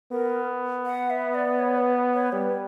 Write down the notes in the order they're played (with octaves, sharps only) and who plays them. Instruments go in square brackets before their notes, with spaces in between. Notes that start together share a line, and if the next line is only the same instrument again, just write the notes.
[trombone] B3 [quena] A#4
[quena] F#5
E5
D5
C#5
B4
C#5
[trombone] G3 [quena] B4